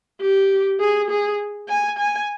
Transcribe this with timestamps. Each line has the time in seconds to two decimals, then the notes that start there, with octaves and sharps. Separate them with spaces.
0.21 G4
0.80 G#4
1.10 G#4
1.68 G#5
1.98 G#5